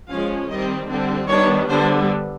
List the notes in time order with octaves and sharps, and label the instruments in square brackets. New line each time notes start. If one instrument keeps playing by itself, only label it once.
[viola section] F3 G#3 C#4 F5
D#3 G3 C4 D#5
D3 G3 C4
D#3 G3 B3 D4 C#5
D3 G3 B3 D4 C5